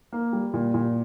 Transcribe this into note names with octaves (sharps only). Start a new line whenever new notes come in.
A#3
G3
A#2
A#2